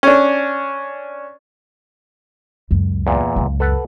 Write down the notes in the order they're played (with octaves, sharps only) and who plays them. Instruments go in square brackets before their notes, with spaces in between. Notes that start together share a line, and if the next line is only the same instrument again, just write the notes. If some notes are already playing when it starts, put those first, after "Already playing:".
[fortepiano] C#4 D4
[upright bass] C#2 F#2
[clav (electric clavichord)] E2 A#2
[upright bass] C#2 F#2
[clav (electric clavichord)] A4 B4 F#5